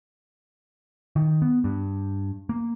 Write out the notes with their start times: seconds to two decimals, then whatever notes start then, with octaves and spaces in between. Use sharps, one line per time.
1.16 D#3
1.42 B3
1.64 G2
2.49 A#3